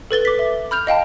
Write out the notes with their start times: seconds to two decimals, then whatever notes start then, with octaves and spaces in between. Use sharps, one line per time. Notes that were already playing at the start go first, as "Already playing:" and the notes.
0.11 A4 B4 A6 G7
0.25 D6 B6
0.39 E5
0.71 B5 F6 G6 F7
0.87 D#5 F5 G5 A5